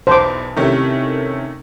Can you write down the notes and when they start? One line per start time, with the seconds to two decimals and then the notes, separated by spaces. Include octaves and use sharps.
0.07 B1 E2 C5 A5 D6
0.57 C3 D#3 A3 C#4 E4